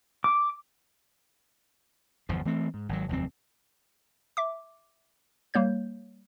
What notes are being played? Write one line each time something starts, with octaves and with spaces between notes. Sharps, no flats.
D6
G1 E2 F3
E3 A3 C4
G#2
G#1 F#3
F1 D#2 F#3 C4
E5 D6
G3 A#3 C#5 G6